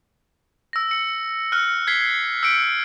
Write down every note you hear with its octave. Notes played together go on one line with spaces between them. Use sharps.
E6 A#6
C#7
F6 F#6 C#7
G#6 B6 C7 G7
E6 G6 B6 C#7 D7